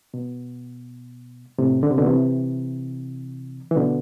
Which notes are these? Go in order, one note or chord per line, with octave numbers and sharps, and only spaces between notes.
B2
A2 C3
D3
C3
B2 D3
C3 E3
E3
B2 D3